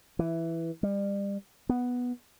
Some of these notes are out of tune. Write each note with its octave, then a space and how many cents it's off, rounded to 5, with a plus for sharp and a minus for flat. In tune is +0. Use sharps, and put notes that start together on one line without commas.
E3 +5
G3 +30
B3 -5